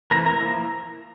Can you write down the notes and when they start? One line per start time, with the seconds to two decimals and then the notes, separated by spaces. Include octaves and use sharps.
0.11 E3 A3 C4 E4 A#4 A#5
0.26 A#4 A#5
0.41 F3 A#3 E4